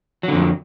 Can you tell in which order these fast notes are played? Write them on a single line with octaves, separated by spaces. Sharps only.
F#3 D3 F2